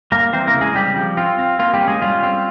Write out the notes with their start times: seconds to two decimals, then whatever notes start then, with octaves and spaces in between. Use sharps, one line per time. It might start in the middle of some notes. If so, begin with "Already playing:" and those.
0.12 G3 A#3 A#4
0.33 E3 C4 C5
0.47 A#3 A#4
0.54 C#3
0.61 G#3 G#4
0.75 G3 C4 G4
0.96 F3
1.17 C4 F4
1.39 C4
1.59 A#3 F4
1.74 G3 G4
1.81 C#4
1.88 G#3 G#4
2.02 G3 F4
2.23 C4